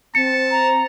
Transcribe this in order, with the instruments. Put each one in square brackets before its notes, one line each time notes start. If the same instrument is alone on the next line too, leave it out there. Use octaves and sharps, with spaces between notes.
[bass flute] C4 [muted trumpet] A5 [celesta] C#7
[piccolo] A#5